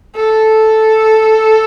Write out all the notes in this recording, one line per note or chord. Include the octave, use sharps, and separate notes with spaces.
A4